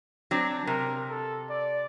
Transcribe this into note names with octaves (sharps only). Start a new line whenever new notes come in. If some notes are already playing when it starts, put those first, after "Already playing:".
F#3 C4 D4
C3 A#4
A4
D5